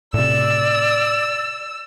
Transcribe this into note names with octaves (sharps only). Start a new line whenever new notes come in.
A2 C3 D5 E6